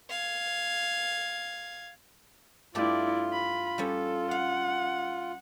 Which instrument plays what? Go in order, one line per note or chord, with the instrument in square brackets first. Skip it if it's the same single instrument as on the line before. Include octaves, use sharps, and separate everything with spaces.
[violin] F5 G#6
[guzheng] G2 A3 G4 [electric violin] E4 D5 [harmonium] F4
[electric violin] B5
[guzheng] G3 C#4 [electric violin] A4
[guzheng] F5 [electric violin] F#5